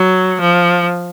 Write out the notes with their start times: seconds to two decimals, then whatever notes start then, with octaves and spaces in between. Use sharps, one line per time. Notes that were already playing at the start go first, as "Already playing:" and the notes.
Already playing: F#3
0.40 F3